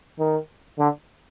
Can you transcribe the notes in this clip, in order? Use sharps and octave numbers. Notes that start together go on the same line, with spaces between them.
D#3
D3